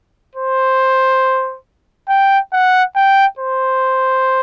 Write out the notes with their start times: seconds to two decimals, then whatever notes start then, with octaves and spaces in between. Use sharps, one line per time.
0.35 C5
2.08 G5
2.53 F#5
2.96 G5
3.39 C5